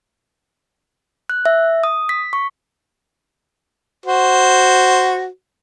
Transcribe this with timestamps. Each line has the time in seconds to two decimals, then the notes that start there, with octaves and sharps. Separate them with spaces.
1.30 F#6
1.46 E5
1.84 D#6
2.09 B6
2.33 C#6
4.06 F#4 C5